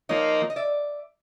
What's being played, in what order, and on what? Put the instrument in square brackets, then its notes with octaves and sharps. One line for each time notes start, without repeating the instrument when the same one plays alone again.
[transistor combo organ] F3 A#3 D#4 [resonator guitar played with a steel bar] C#5 D#5
[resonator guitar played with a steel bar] D#5
D5 E5